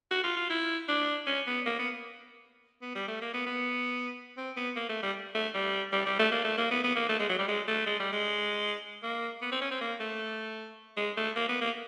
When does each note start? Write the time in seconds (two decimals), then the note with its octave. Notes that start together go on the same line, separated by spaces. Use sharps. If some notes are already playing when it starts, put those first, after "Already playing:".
0.11 F#4
0.24 F4
0.37 F4
0.50 E4
0.88 D4
1.27 C#4
1.47 B3
1.66 A#3
1.79 B3
2.82 B3
2.95 G3
3.08 A3
3.22 A#3
3.34 B3
3.47 B3
4.37 C4
4.57 B3
4.76 A#3
4.89 A3
5.02 G3
5.35 A3
5.55 G3
5.93 G3
6.06 G3
6.19 A3
6.32 A#3
6.45 A3
6.58 A#3
6.71 B3
6.84 B3
6.96 A#3
7.09 A3
7.19 G#3
7.29 F#3
7.39 G3
7.48 G#3
7.68 A3
7.86 G#3
8.00 G3
8.12 G#3
9.03 A#3
9.42 B3
9.52 C4
9.61 C#4
9.71 C4
9.81 A#3
10.00 A3
10.97 G#3
11.17 A3
11.36 A#3
11.49 B3
11.61 A#3